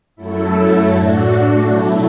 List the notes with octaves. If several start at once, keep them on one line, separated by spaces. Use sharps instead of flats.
F#2 F#3 A3 E4 A4
A2 A3 D4 F#4
B2 F#3 A3 E4 A4